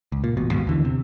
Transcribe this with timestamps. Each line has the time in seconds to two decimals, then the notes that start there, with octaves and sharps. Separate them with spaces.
0.12 C#2
0.24 A#2
0.37 A1 B2
0.51 A1 D#2 G#2 B2
0.67 D#2 D3 E3
0.85 C3